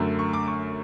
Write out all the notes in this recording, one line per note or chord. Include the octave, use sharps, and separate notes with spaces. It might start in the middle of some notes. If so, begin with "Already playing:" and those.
Already playing: F#2 D3 A3
C#6
D6
C#6